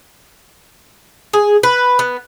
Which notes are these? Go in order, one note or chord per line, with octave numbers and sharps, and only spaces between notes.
G#4
B4
B3